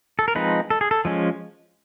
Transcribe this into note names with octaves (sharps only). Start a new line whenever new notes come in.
A4
A#4
F3 G#3 C4 D#4 B4
A4
G#4
A4
F3 G#3 C#4